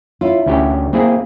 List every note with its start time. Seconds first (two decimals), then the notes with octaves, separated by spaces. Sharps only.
0.21 E4 F4 C#5 E5
0.46 D2 C#4 G4
0.93 A#3 C4 E4 G#4